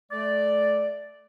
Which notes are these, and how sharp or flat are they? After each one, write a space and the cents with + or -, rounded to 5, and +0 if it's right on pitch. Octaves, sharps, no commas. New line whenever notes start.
A3 -25 D5 +0